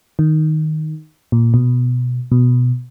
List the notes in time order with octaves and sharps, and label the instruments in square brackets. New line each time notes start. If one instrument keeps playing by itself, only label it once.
[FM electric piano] D#3
A#2
B2
B2